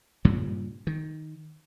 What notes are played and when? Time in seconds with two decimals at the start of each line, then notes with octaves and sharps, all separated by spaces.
0.25 G2 A#2 C#3 G3
0.87 D#3